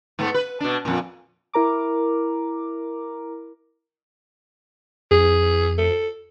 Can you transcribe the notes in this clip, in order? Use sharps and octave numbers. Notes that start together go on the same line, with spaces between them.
G#2 A3 B3
B4
B2 D4
F2 A#2
E4 A#4 A#5 D6
F2 G#4
A4